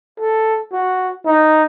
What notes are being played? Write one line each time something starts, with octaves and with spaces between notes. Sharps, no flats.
A4
F#4
D#4